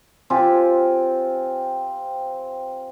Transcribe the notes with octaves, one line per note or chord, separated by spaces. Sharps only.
C4 F4 G4 G#5